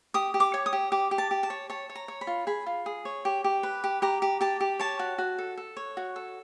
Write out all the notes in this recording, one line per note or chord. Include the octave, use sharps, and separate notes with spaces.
G4 D#6
G4
D6
C#5
D#6
G4
G4 D6
G4
A5
G4
A5
C#5
C#5 A5
C#5
A#5
C#5
B5
F4
G#4 B5
F4
G#4
C#5
G4
G4
B4
G4
G4 A#5
G4
G4 A5
G4
C#5 A5
F#4
F#4
A4
A4
C#5
F#4
A4